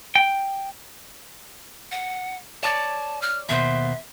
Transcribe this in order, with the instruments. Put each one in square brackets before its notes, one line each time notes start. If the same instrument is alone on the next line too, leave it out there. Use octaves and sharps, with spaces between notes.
[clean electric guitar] G5
[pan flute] F#5
[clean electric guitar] C#5 D5 [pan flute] A5
[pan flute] F6
[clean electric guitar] D#2 B2 C5 [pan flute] E5